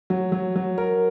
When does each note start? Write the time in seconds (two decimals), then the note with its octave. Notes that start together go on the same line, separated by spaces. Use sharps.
0.10 F#3
0.32 F#3
0.56 F#3
0.78 A#4